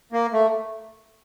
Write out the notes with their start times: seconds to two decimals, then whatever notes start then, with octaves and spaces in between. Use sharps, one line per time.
0.13 A#3
0.33 A3